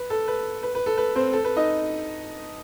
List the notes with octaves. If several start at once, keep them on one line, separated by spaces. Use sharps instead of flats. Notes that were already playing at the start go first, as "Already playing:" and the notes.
Already playing: B4
A4
B4
B4
B4
A4
B4
C4 C5
A4
B4
D#4 D#5